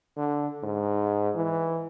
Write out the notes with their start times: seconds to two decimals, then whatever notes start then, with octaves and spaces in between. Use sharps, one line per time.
0.17 D3
0.63 G#2
1.35 E3